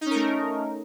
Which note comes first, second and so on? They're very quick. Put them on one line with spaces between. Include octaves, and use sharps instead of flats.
D#4 C#4 A#4 A3